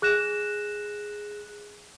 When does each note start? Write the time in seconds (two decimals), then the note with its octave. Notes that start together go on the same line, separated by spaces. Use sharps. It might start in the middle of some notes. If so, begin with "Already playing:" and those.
0.02 G#4 F#6 A#6 E7